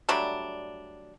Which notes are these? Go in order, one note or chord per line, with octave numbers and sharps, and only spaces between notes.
F#3 G3 A3 D4